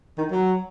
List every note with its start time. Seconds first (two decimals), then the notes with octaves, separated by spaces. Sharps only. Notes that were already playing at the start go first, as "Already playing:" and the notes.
0.18 D#3
0.31 F#3